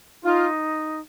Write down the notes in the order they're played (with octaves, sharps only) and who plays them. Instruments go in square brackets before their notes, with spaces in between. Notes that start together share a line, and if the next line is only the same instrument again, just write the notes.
[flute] D#4 [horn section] F4